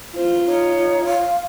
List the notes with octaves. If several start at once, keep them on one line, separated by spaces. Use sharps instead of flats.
F4 C5
D#4 C#5
F5